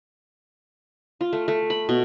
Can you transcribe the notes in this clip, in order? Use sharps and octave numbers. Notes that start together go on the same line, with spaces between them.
F4
A3
A3
B5
B2